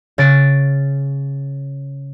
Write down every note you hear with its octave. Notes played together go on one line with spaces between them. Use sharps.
C#3 A6 D7